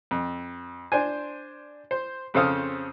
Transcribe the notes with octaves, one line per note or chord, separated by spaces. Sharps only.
F2
D4 C5 G#5
C5
F2 C#3 A4 C5 F5 D#6